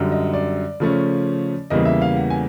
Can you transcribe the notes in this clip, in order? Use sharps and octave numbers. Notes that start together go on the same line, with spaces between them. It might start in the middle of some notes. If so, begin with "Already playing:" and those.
Already playing: F#2 D3 G3
D#5
D5
C#3 F3 A3 C#4
E2 C#3 E3 G3 A#3 D#5
E5
F5
F#5
G#5